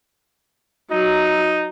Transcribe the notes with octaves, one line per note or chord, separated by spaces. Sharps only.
F#3 D#4